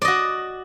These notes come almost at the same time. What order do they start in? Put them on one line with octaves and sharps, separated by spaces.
D5 D#5 F#4